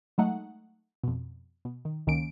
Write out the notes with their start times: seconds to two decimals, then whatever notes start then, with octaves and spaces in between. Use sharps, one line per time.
0.18 F#3 G#3 A3 D#4 F#5
1.04 F2 B2
1.65 B2
1.85 D#3
2.07 C#2 D#3 A#3 C#4 D7